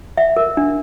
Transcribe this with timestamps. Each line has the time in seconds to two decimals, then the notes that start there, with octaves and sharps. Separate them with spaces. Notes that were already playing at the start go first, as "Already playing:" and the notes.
0.17 E5
0.37 A#4
0.57 D4